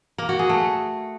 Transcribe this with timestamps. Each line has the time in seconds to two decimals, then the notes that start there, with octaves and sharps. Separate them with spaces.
0.18 A#3
0.29 F#4
0.39 G#4
0.49 A3